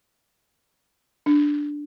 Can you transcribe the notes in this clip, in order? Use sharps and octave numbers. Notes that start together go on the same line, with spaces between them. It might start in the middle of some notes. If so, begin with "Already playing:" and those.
D4